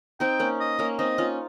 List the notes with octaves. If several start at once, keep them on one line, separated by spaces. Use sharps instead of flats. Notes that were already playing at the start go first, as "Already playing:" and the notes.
C4 D#4 G5
A#3 C#4
D#5
A#3 C#4
C4 D#4 D#5
C#4 F4